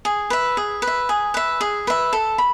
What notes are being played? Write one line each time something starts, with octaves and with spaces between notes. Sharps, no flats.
G#4
B4 E5
G#4
B4
E5
G#4
B4 E5
G#4
B4 E5
A4
B5